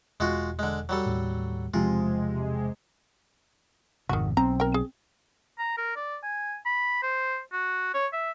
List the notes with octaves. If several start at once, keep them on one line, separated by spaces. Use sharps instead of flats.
E1 G#3 F4 F#4
D3 G#3
F#3 G3 A4
D#2 A2
E1 C3 F3 G#3 F4
G#1 F2 C3 D#3 F#4
B1 C4 A#5
A#4 G5
G#4
A#5
A#4
D5
G#5
B5
C5
F#4
C#5
E5